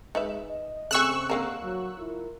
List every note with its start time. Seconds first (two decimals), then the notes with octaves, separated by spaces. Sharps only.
0.15 G#3 D#4 B4 E5
0.50 D#5
0.91 C#3 A3 C4 G#4 C#6 E6 F#6
1.30 D3 A#3 A#4
1.62 F#3
1.98 E4 F4 A#4